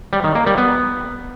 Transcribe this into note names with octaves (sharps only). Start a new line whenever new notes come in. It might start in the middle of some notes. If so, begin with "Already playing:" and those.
G3
D#3
A#3
G3
B3